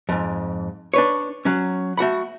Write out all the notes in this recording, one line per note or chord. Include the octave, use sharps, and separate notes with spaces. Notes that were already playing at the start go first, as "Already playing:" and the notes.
F2 G#2
D4 B4 C#5
F#3 C#4
A3 F#4 F#5 B5